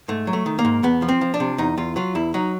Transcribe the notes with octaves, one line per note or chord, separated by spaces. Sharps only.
G#2 A3
F#3
A3
D#3
A#3
G#2
E2 B3
F3
C4
F3
D4
C3
E2 D#4
E2 F4
F#3 F4
E2 E4
F#3 D#4